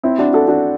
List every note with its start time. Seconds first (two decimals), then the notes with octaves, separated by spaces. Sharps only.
0.03 C4 E4
0.18 D4 F#4
0.33 F#4 A4
0.48 D4 F#4